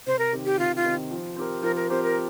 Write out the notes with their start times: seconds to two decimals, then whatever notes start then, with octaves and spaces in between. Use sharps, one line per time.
0.07 C3 C5
0.19 A#4
0.33 D#3 C4 G4
0.45 G4
0.58 C3 F4
0.76 F4
0.84 D#3 C4 G4
1.11 F3
1.36 C4 G4 A#4
1.62 F3 A#4
1.76 A#4
1.90 C4 G4 A#4 C5
2.03 A#4